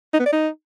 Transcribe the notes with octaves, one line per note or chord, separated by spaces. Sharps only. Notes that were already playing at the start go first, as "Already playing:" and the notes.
D#4
B3
D5
D#4